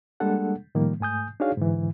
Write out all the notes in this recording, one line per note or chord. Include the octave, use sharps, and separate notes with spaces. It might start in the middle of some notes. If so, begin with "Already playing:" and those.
G3 G#3 A#3 D4 A4 F#5
A2 D#3 F3 G3 A#3
G#2 A3 G#5 D#6 G6
D4 D#4 F#4 G#4 C#5 F5
G#2 D3 E3